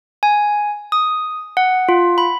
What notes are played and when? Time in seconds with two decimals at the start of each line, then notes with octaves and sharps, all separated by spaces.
0.23 G#5
0.92 D#6
1.57 F#5
1.89 F4
2.18 B5